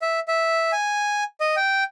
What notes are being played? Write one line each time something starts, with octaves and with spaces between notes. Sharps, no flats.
E5
E5
G#5
D#5
G5